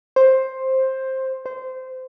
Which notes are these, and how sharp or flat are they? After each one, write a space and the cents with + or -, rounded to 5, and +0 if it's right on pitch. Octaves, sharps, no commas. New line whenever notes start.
C5 +10
C5 -20